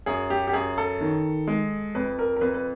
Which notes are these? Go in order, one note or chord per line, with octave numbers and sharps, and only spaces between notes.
F#2 G#4
G4
G4
F#2 G#4
A4
D#3
G#3
F2 B4
A#4
A#4
F2 B4
B4